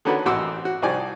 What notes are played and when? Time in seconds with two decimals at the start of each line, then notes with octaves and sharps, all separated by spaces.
0.05 D3 D#3 C#4 D4 F#4 B4
0.26 A1 C3 F#4 C5 D6 E6
0.65 F#4
0.82 C2 F3 D#4 G4 D5 G#5